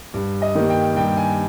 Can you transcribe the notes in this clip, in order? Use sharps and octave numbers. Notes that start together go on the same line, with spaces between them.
G2
D#5
D#3 G3 A#3
G5
G2 G5
G#5